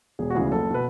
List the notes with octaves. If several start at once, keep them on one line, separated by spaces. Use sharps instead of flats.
E1 G#4
F#4
D2 C#3 E3 G#4
F#1 A4
B2 B4